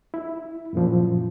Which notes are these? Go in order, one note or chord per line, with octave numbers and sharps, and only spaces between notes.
E4
F#2 A#2 F3